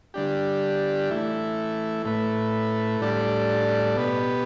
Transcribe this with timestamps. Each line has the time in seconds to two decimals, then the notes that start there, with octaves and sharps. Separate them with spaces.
0.14 D3 G3 D4 G4
1.10 E3 A3 E4
2.05 A2 A3 E4 B4
3.01 A2 G3 D4 A4 D5
3.96 B2 B3 G4 B4